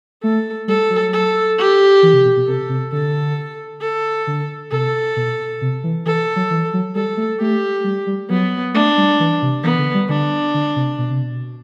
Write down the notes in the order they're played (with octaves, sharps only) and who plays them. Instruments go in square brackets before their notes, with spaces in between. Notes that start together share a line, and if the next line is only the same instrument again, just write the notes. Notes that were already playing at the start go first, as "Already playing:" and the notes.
[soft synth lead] A3 [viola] A4
[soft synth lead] G3 [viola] A4
[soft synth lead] F#3
[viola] A4
G4
[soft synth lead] E3
C3
B2
B2
[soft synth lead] C3 [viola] A4
[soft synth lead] C3
[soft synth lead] D3 [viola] A4
[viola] A4
[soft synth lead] D3
[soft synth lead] C3 [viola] A4
[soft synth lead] B2
C3
E3
[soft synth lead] E3 [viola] A4
[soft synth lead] F#3
E3
F#3
[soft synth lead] G3 [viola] A4
[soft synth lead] A3
[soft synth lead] A3 [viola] G4
[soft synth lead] G3
G3
[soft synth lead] F#3 [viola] B3
[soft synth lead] A3 [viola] D4
[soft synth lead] G3
E3
C3
[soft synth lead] E3 [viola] B3
[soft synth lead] D3
G3
[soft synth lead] D3 [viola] D4
[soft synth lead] D3
C3
B2
C3
B2